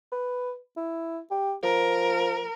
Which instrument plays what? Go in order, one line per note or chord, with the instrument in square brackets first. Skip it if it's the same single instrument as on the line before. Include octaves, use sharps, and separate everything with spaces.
[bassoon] B4
E4
G4
[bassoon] F3 [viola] A#4